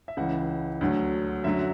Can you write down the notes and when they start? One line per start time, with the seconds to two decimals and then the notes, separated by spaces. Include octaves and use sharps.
0.08 E5
0.17 C#2 C#3 E3 F#5
0.81 D2 D3 F#3
1.44 F#2 D3 F#3 E5